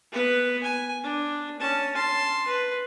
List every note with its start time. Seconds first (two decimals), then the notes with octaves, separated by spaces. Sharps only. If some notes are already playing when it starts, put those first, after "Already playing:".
0.12 B3 B4
0.63 G#5
1.03 D4
1.59 C#4 A5
1.95 A5 C6
2.47 B4